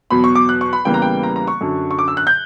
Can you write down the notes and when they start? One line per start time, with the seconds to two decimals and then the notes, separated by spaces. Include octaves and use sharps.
0.10 E2 B2 F#3 B5
0.24 C#6
0.35 D6
0.49 F#6
0.61 C#6
0.73 B5
0.85 E2 C#3 E3 G3 A#3 G5
0.94 A#5
1.02 G5
1.23 A#5
1.36 A#5
1.48 C#6
1.61 F#2 D3 F#3
1.91 C#6
1.99 D6
2.08 E6
2.17 F#6
2.27 G6